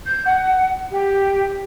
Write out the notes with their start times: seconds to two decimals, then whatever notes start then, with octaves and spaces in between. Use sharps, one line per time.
0.07 G6
0.25 F#5
0.90 G4